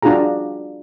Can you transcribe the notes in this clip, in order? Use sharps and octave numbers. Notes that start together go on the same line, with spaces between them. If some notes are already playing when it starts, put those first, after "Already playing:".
D4 F4 F#4 G#4 A#5